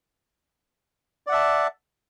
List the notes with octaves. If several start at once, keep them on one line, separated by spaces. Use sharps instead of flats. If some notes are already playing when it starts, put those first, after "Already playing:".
D5 E5 F#5 A5